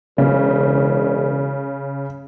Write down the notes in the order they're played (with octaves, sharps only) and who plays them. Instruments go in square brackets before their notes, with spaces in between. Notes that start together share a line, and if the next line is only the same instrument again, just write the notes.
[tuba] E1 [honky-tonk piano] C#3